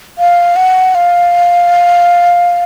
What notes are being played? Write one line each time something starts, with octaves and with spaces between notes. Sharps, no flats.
F5
F#5
F5